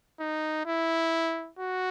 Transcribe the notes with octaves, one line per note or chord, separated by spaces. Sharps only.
D#4
E4
F#4